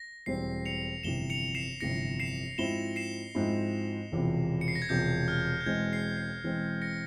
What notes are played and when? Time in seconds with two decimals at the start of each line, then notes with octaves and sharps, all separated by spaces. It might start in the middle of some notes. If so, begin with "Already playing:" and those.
Already playing: A#6
0.26 E1 E2 E3 G3 C4 C7
0.66 C#7 F7
1.03 G1 F2 C3 E3 E7 G7
1.30 C#7 F7
1.55 C7 E7
1.80 G1 F2 C3 E3 A#6 C#7
2.20 C7 E7
2.58 G#2 F3 C4 E4 E7 G7
2.96 C7 E7
3.35 G#2 F3 C4 E4
4.12 E1 E2 C3 F3
4.61 C#7
4.68 C7
4.75 A#6
4.82 G#6
4.89 E1 E2 C3 F3 G6
5.28 F6
5.61 G6
5.66 E1 E2 E3 G#3 C4 G#6
5.93 C7
6.17 C7
6.43 E1 E2 E3 G#3 C4
6.82 A#6 C#7